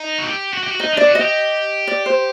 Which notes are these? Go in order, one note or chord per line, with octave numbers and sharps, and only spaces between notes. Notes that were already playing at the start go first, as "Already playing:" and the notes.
Already playing: D#4
F#4
G4
F#4
G4
F#4
D#4 D#5
D4 D5
F#4
D#5
G4
D5
C5